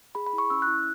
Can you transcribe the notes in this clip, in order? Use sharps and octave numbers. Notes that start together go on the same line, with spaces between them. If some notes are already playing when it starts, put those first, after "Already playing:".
G#4 B5
B5
E4
C#6
C#4 E6
F#6
E4